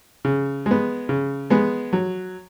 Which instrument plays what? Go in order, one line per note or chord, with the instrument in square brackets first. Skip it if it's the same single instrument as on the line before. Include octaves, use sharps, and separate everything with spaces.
[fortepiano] C#3
G#3
B3
C#3
G#3 B3
F#3